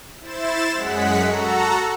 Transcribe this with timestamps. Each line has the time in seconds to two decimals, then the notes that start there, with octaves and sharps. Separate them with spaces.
0.21 E4 C5 A6 E7
0.75 F#2 G#3 F#5 B6
1.24 F#4 A4 A#5